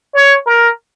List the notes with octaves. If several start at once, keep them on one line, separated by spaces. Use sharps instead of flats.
C#5
A#4